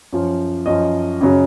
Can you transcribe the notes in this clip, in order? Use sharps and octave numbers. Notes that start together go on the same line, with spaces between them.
F#2 F3
F#2 F3 D#5
F#2 C#3 F#3